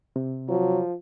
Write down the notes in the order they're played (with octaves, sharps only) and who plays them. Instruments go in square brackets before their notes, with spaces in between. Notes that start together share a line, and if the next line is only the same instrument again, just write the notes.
[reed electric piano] C3
[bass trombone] F3 [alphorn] F#3